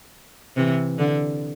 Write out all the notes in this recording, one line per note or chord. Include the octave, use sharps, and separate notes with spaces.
C3 E3
D3